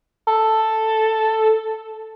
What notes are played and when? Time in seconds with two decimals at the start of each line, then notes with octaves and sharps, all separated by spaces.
0.27 A4